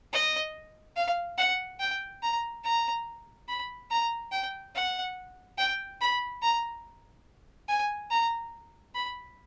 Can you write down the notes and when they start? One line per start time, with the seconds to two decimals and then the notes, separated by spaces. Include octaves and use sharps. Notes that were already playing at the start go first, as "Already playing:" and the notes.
0.13 D#5
0.96 F5
1.38 F#5
1.80 G5
2.22 A#5
2.64 A#5
3.48 B5
3.90 A#5
4.32 G5
4.75 F#5
5.58 G5
6.01 B5
6.42 A#5
7.68 G#5
8.10 A#5
8.95 B5